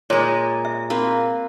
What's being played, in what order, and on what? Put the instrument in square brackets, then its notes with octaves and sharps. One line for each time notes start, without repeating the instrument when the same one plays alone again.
[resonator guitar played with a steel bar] A#2 G#3 [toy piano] C#5
[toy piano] E5
[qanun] A#3 C4 B4